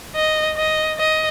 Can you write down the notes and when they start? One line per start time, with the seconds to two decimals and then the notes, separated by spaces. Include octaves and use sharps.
0.16 D#5
0.57 D#5
0.99 D#5